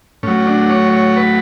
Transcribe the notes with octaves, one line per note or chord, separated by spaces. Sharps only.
A2 F#3 C#4
D4
C#5
C#5
B4